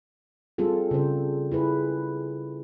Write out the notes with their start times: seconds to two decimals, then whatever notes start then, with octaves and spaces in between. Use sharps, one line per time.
0.58 G3 C4 F4 G#4 A4
0.91 C#3 C5
1.51 E4 G#4 B4